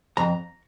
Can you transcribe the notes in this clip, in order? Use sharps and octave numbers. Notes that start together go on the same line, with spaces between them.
F2 A#5